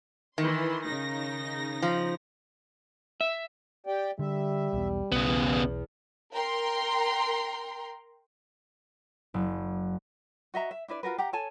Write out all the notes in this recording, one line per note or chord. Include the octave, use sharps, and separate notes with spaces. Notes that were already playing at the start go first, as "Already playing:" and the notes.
D#3 E3 C6
C#3 D#4 A#6
F3
E5
G4 D5 G5
D3 G3 E5
B1 E2 B2
B1 E2 C#3 B3
A#4 G5 A#5 C6
F#1
F#4 D#5 E5 A#5
E5
D4 E4 B4 D5
F4 F#4 A#4 B4
G4 F#5 A#5
A4 C#5 G#5 A5